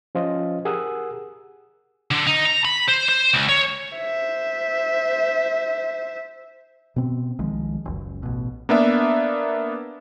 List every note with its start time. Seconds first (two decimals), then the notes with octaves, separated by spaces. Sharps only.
0.15 F3 C#4 F4 C5 D#5
0.65 G4 G#4 A#4 F#5 D#6 E6
2.11 D3
2.27 D#4
2.45 A#5
2.65 B5
2.88 C5
3.08 C5
3.34 C#2
3.49 C#5
3.96 C5 E5
6.96 B2 B3 C4
7.39 C2 D#3 F3 G#3
7.85 F#1 C#2
8.23 A1 B2
8.69 A#3 B3 D4 E5